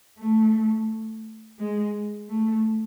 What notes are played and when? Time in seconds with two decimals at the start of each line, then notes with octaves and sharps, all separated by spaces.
0.18 A3
1.59 G#3
2.29 A3